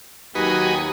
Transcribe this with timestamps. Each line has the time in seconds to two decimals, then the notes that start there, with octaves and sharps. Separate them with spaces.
0.35 D#2 F#3 D#4 F#4 G4 B4 G#5 D#6